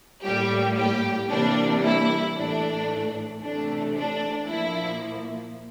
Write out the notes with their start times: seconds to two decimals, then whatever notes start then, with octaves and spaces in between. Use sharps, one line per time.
0.24 A2 G3 A#3 G4
0.77 G4
1.30 C3 E3 G3 A#3 D4
1.83 E4
2.36 A2 E3 A3 D4
3.42 C3 E3 A3 D4
3.96 D4
4.49 A#2 F3 A#3 E4